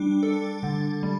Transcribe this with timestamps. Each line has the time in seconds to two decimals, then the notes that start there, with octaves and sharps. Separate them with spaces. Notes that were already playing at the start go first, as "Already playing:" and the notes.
Already playing: G3 D4
0.23 A4
0.63 D3
1.03 G3